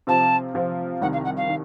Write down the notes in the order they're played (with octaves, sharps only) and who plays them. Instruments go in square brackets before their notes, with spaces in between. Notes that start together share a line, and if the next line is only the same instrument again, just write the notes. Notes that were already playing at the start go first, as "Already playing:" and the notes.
[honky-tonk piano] C3 F3 C4 F4 [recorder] A5
[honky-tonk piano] C3 F3 C4 F4
[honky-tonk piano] C2 C3 D#3 [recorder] F#5
[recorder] F5
F#5
F5
[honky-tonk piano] D#3